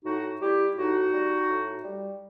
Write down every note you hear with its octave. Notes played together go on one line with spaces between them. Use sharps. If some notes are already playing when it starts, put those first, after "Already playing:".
A2 D#4 F#4
G3 E4 G4
A2 D#4 F#4
G3
A2
G3